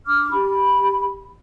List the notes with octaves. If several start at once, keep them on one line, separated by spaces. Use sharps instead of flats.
D4 D6 F6
G4 B5